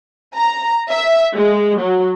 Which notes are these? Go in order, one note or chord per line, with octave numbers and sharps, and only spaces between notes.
A#5
E5
G#3
F#3